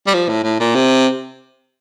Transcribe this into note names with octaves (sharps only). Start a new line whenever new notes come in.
G3
F3
A2
A2
A#2
C3